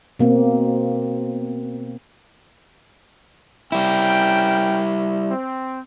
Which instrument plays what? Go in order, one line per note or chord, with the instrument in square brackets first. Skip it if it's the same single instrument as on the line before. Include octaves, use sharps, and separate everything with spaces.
[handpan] B2 A#3 C4
[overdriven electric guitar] G3 E4 [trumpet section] C#4 A#4 G5
[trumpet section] C4